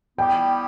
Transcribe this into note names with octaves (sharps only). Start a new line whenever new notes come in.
G3 B3 E4 G4 G5